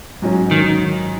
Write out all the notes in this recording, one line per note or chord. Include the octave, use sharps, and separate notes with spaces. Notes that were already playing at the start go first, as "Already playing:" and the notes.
G#2 F#3 C#4
D#3